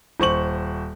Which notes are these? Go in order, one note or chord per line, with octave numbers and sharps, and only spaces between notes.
D#1 C5 C#6 F#7